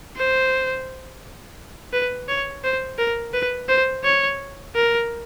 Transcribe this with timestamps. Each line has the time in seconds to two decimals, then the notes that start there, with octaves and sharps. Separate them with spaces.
0.17 C5
1.93 B4
2.28 C#5
2.64 C5
2.98 A#4
3.34 B4
3.69 C5
4.04 C#5
4.75 A#4